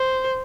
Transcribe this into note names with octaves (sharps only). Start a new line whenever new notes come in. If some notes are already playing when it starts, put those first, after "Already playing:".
Already playing: C5